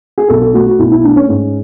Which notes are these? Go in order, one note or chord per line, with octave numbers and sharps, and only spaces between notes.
G#4
B1 A4
A4
A3 F#4
F#4
B1 E4
E4
A3 D4
C#4
G#2 C#4